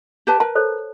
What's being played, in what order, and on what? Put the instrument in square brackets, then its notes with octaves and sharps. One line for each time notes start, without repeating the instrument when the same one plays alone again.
[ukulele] G4 B4 A5
[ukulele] A#4 B4 [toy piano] A5
[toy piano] A4 C5 C#5